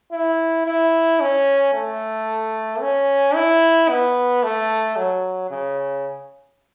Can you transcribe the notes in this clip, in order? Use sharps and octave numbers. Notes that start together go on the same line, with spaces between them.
E4
E4
C#4
A3
C#4
E4
B3
A3
F#3
C#3